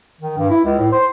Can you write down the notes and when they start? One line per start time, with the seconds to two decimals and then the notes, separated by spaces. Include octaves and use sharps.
0.21 D#3
0.38 G2
0.50 E4
0.64 C#2
0.79 A2
0.92 C5